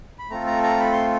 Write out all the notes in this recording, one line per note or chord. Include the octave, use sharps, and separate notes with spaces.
B5
A3 C4 F4 A4 A#5
A#5
A#5
B5
C6